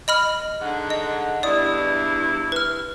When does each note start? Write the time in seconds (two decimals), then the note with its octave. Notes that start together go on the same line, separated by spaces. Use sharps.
0.08 D#5 B5 F6
0.60 G#2 D3 F#5
0.90 D#5
1.43 E2 G2 E4 D5 D#6
2.52 B4 F6